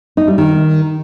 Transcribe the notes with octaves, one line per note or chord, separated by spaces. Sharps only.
D#4
G3
D#3